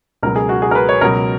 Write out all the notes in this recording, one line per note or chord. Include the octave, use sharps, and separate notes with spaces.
C#2 B2 F#3 A#4
G#4
F#4
G#4
A#4
B4
C#5
C#2 B2 F#3 A#4